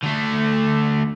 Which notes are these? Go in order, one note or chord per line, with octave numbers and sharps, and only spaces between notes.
D3 A3